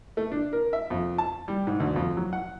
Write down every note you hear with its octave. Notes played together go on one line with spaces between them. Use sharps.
A3
D4
A#4
E5
F2
A5
G3
G#2
D2
F2
F#3
F#5